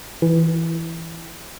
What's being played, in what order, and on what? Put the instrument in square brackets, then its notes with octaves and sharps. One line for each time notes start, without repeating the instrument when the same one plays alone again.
[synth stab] E3